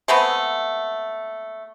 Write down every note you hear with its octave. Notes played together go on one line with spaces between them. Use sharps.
G#3 A3 B3 C4